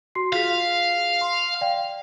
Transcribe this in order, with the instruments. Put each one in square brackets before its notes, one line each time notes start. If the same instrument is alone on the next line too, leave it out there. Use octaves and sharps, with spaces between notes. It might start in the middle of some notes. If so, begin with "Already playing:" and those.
[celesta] F#4 C6 C7
[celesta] F4 G#4 B6 [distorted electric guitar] F5
[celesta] C6
D5 F5 G5